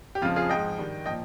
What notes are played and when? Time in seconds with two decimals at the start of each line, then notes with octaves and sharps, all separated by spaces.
0.15 G4
0.22 F2 C#3 F3 F4
0.36 F4 G#4
0.49 G#2 F3 D#5 G5
0.78 G2 D#3
1.06 A#2 F3 D#5 G5